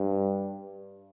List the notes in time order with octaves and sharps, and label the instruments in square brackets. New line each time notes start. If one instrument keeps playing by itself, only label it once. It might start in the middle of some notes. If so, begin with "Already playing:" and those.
Already playing: [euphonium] G2